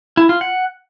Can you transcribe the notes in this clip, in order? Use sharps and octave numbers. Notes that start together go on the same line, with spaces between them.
E4
F4
F#5